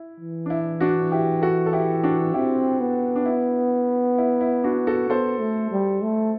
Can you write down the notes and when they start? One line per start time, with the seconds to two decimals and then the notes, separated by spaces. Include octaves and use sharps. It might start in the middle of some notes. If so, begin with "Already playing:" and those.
Already playing: E4
0.20 E3
0.46 D4
0.50 E4
0.80 D4 F#4
1.12 E4 G4
1.42 F#4 A4
1.66 A4
1.73 E4 G4
2.04 D4 F#4
2.34 C4 E4 G4
2.80 B3
3.16 D4
3.26 E4
4.18 E4
4.41 E4
4.64 D4 F#4
4.87 F#4 A4
5.10 B3 A4 C5
5.40 A3
5.72 G3
6.02 A3